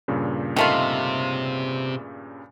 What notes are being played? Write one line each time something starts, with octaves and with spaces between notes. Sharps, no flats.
G2 A#2 C#3
C3 D#3 A3 F4